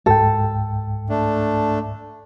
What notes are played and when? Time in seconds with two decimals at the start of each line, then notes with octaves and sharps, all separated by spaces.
0.06 C#2 G#2 A4 G5
1.09 A3 D4